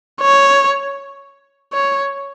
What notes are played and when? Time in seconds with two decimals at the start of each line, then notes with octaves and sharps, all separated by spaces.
0.21 C#5
1.73 C#5